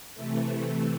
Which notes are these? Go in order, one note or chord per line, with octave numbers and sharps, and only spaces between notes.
C3 E3 A3